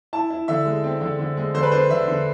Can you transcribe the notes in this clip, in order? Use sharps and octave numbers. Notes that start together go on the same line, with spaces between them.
E4 A5
E4
D3 E5
G#3
C4
D3
D3
G#3
D3 C5
B4
D4 C5
D3 E5
D3